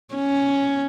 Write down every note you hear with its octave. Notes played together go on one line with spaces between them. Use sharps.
C#4